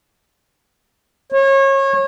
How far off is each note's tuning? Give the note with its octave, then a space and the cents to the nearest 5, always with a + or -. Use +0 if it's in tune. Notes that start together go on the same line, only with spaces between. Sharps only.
C#5 -30